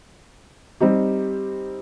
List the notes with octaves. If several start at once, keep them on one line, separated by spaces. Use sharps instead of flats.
G3 C4 D#4 G4